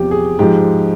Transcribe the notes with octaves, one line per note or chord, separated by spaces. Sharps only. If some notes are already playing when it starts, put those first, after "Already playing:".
Already playing: E2 C3 F3 G4
G#4
G#2 F3 G#3 G4